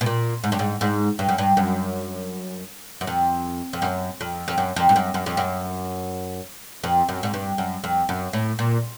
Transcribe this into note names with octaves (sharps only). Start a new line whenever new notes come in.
B2
A#2
G#2
G2
G#2
G#2
G2
F#2
G2
F#2
F#2
F2
F2
F#2
F2
F2
F#2
F2
G2
F#2
F#2
F2
F#2
F2
F#2
G#2
G2
F#2
F2
F#2
A2
A#2